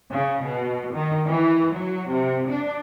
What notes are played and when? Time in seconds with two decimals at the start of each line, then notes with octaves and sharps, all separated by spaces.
0.10 C#3
0.43 B2
0.94 D#3
1.27 E3
1.75 F#3
2.10 C3
2.49 D4